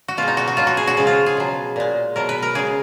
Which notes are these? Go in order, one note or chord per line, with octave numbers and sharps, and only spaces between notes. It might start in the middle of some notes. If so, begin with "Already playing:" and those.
F#4
B2 G#3 F4
D#4
F#4
F#4
B2 F#3 F4
F#4
G#4
F#4
C#3 F3 G#3 G#4
F4
G#4
B2 F#3
A#2 G#3
B2 F#3 A#4
B4
A#4
C#3 G#3 G#4